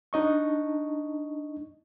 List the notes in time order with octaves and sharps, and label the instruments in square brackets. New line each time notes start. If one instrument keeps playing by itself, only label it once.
[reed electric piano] D4 D#4 D#5 C#6